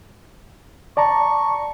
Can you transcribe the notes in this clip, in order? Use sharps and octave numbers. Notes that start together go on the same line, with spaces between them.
D5 A5 A#5 C#6